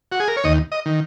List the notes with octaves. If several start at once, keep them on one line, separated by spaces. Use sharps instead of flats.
F#4
G#4
A#4
C#5
D#2 D#5
D#5
D#3